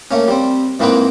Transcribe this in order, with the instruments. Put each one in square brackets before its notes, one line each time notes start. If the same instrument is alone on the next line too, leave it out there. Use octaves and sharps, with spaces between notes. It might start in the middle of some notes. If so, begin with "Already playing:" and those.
[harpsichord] A3 A#3 C#4
G3 C4
G#2 E3 A#3 C4 B4 G5